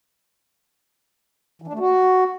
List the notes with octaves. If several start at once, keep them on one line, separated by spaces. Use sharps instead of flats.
E3
D4
A3
F#4